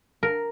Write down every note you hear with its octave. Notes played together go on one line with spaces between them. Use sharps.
A#4